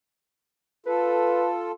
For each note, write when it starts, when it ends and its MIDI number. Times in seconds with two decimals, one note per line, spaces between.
0.86 1.72 65
0.86 1.72 69
0.86 1.49 71